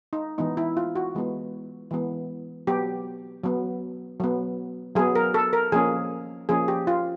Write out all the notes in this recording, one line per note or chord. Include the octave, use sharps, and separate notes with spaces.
D#4
E3 G#3 B3 D#4
E4
F4
F#4
E3 G#3 B3
E3 G#3 B3
F#3 B3 G4
F#3 B3
F#3 B3
F#3 B3 G#4
A#4
A4
A#4
F3 A#3 C#4 G#4
F3 A#3 C#4 G#4
G4
F4